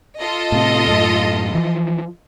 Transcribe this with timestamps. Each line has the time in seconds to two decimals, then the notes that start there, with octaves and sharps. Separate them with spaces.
0.18 F4 A4 D#5
0.52 A2 C3
0.87 F#2 A2
1.55 E3 F3